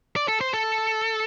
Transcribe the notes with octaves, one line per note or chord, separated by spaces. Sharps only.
D5
A4
C5
A4